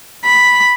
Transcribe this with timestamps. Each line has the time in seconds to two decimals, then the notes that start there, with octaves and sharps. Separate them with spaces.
0.25 B5